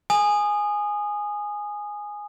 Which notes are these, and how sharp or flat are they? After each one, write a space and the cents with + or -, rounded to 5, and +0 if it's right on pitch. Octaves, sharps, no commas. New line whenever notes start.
G#5 +0 D#6 -20